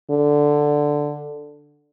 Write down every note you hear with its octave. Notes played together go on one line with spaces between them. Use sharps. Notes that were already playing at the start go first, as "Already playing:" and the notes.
D3